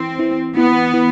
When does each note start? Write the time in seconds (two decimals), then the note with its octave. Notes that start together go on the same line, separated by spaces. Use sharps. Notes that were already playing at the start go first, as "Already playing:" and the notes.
Already playing: E3 C4
0.19 E3
0.57 E3 B3
0.93 E3